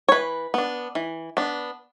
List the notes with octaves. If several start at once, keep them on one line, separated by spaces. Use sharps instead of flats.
C#5
E3 B4
B3 D4
E3
B3 D4